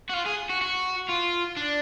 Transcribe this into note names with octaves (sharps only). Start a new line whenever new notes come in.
F#4
F4
G#4
F#4
F#4
F4
D4